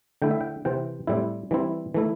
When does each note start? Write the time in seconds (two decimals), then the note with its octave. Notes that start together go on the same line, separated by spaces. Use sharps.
0.22 D3 A3 E4 G5
0.31 E5
0.41 G5
0.65 C3 E3 C4 G5
1.07 A2 G3 C4 E4
1.51 E3 G3 C4 E4
1.94 E3 A3 E4